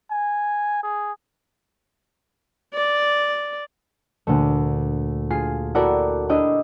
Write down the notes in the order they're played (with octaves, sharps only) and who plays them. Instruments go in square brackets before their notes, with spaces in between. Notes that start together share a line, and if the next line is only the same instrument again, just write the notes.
[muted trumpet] G#5
G#4
[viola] D5
[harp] D2 A#2 A3
F4 G#4 C7
E4 F#4 G4 A4 A#4 D5
D4 E4 G4 D5 D#5